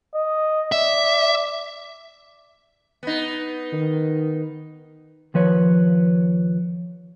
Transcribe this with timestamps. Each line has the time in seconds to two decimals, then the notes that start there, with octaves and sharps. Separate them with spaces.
0.15 D#5
0.72 D5 E5
3.03 B3 D#4
3.73 D#3
5.34 D#2 F3 B4 C#5